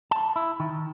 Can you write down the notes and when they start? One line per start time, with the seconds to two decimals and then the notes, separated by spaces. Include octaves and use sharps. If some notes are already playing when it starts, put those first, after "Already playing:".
0.11 A5
0.36 E4
0.60 D#3